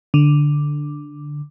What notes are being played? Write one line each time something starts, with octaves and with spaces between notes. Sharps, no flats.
D3